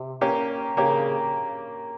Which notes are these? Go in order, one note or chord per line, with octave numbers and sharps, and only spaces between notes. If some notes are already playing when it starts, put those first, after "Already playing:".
Already playing: C3
A#3 C#4 G4
C#3 A#3 C#4 G4